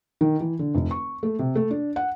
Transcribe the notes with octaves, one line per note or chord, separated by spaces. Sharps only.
D#3
E3
D3
F1
C#6
A3
C3
A3
D4
F#5